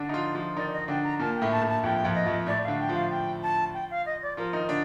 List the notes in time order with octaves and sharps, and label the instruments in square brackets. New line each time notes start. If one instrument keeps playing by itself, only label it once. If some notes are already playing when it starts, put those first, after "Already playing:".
Already playing: [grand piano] D3 D4
D#4
F3 F4
F3 F4
[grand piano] D#3 D#4 [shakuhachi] D5
[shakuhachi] D#5
[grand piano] D3 D4 [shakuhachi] G5
[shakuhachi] A#5
[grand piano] A#2 A#3 [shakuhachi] A5
[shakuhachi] G5
[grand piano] A2 A3
[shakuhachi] A5
[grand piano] A2 A3
[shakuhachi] A5
[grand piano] F2 F3 [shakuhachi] G5
[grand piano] F2 F3
[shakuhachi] D#5
[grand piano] F2 F3
[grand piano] A2 A3 [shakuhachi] D5
[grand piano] D3 D4 [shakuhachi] F5
[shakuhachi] G5
[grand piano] F3 F4
[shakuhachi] F5
G5
A5
G5
F5
D#5
D5
[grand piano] F3 F4 [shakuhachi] A#4
[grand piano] D#3 D#4
D3 D4